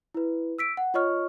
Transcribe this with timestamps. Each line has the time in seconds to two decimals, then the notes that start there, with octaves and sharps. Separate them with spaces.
0.14 E4 B4
0.59 E6 B6 D7
0.77 F#5
0.94 F4 C#5 D#5 C#6 F6